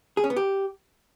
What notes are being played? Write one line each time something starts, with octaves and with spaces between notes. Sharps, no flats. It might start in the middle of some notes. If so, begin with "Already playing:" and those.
G#4
C#4
B3
G4